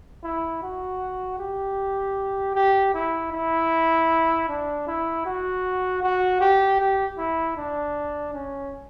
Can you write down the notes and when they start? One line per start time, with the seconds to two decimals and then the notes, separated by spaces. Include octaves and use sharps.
0.24 E4
0.62 F#4
1.39 G4
2.55 G4
2.94 E4
3.32 E4
4.49 D4
4.87 E4
5.25 F#4
6.03 F#4
6.40 G4
6.80 G4
7.18 E4
7.57 D4
8.33 C#4